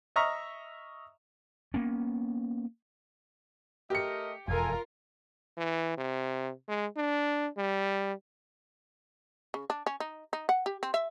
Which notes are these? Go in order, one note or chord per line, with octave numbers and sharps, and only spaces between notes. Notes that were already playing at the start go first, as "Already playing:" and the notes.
D#5 E5 A#5 C#6 F6
A#3 B3 C#4
A3 G4 A#4 D#5 C#7
E1 F2 F4 A4 A#4 G#5
E3
C3
G#3
D4
G3
C#3
D4
C#4
D#4
D#4
F#5
G4
C4
E5